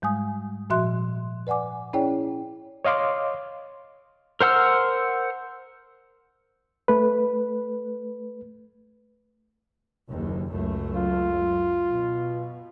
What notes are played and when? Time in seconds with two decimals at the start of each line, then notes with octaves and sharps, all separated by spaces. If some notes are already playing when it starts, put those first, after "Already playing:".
0.02 G#2 G3 G#3 G#5 D#6
0.70 A#2 F3 F#4 E5 C6 F#6
1.47 B4 D5 F#5 G#5 D6
1.93 C#4 E4 G#4 C#5 D5 G5
2.85 C#5 D#5 F5 C6 D6
4.41 A#4 C5 F#5 E6 F6
6.88 A3 B4
10.09 F#1 D#2
10.50 C#2 F#2 A3
10.95 F4
11.90 B2